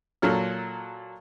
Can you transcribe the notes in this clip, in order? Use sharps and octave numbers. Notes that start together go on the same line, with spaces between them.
A#2 F#3 A4 C#5 F6